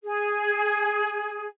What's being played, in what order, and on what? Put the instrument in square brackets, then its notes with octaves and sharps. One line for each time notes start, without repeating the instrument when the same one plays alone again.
[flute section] G#4